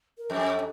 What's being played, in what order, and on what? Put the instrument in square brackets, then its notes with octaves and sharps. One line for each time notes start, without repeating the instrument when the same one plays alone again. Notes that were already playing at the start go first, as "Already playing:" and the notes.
[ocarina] A#4
[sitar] F2 [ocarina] A4